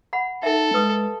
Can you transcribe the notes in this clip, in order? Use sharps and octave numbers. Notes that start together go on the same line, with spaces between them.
F#5 B5
D#4 A4 E5
G#3 B4 D#6